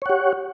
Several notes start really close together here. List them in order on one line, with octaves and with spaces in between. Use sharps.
C#5 F#5 G4